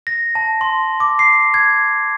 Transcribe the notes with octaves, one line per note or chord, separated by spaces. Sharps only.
A#6
A5
C6
D6
C7
G#6